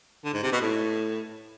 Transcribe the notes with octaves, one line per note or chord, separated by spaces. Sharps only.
D3
G#2
C3
B2
A2